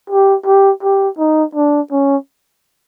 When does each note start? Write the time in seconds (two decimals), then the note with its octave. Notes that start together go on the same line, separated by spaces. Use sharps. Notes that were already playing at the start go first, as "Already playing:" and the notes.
0.10 G4
0.46 G4
0.84 G4
1.19 D#4
1.56 D4
1.92 C#4